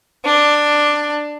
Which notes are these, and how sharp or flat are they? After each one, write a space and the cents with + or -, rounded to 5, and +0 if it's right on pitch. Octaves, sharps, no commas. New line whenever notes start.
D4 +10